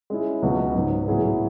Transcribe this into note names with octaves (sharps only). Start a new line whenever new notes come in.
G#3 C#4 E4
C#2 B2 F#3 B3 F#4
G#2 F#3 B3
A2 F#3 B3 E4 G#4